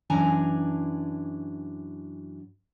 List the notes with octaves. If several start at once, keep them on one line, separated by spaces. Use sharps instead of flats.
F#2 E3 D4 G#5 A#5